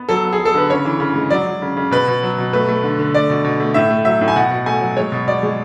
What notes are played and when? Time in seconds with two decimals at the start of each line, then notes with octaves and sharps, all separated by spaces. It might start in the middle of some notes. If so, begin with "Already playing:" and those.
Already playing: B3
0.09 F#3 A4
0.24 B3
0.33 G#4
0.39 F#3
0.45 A4
0.54 D3 B4
0.70 C#3 C#5
0.85 E3
1.00 C#3
1.15 G#3
1.31 F#3 D5
1.47 F#3
1.62 C#3
1.77 C#3
1.91 B2 B4
2.07 B2
2.23 F#3
2.38 B2
2.53 A3 B4
2.68 A3
2.83 D3
2.99 D3
3.14 A3 D5
3.30 B2
3.44 B2
3.60 A3
3.74 A2 E5
3.90 A3
4.05 F#3 E5
4.21 A2
4.28 G#5
4.36 B2 F#5
4.51 B2
4.66 A3 G#5
4.81 F#3
4.97 G#3 C#5
5.12 B2
5.27 B2 D5
5.43 G#3